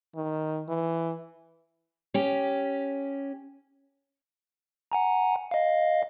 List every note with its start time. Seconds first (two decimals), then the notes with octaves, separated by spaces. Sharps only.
0.15 D#3
0.69 E3
2.14 C#4 G4
4.92 F#5 G#5 A#5
5.51 D#5 F5